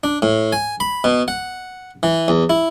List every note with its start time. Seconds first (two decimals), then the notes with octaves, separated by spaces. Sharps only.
0.04 D4
0.22 A2
0.53 G#5
0.80 B5
1.04 B2
1.28 F#5
2.03 E3
2.28 E2
2.50 E4